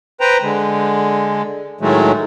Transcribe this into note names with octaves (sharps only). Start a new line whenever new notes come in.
B4 C5 G5 A#5
D3 G#3
A2 D#3 F#3 G#3 A3